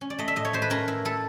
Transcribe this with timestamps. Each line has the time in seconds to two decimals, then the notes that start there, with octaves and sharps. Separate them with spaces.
0.01 C#4
0.10 D5
0.18 A3 D#5
0.28 E5
0.36 A2 D#5
0.45 C#5
0.53 A3 C5
0.62 B4
0.70 C#4 A#4
0.88 E4
1.05 E4 A4